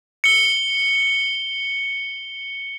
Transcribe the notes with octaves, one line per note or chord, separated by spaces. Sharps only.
C#7 G7